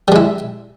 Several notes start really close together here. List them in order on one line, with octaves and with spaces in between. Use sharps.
G3 G#3 E4